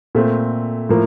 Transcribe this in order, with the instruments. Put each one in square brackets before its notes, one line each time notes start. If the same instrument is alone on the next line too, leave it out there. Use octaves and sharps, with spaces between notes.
[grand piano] A#2 A3 C4
A2 F3 A#3